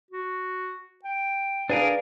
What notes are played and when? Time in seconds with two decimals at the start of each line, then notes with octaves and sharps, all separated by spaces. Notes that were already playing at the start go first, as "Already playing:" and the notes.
0.11 F#4
1.05 G5
1.69 D4 G#4 A#4 B4 D5 F5